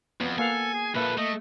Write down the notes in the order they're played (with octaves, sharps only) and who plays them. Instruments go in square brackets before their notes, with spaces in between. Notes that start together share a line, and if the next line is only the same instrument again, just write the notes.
[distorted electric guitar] F2 [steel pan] B3
[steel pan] A#3 F5 F#5 [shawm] A4 [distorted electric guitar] G#5
[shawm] G#4
[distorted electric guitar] A#2 A4 [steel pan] A#3 E5 [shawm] B4
[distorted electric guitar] A3 [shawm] D#5